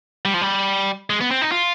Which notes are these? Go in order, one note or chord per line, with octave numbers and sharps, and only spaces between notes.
G3
F3
G3
G#3
B3
C4
D#4
F4